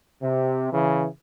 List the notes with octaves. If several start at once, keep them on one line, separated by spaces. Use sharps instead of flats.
C3
C#3 E3